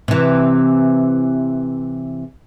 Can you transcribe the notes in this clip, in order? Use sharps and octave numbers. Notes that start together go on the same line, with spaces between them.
C3 E3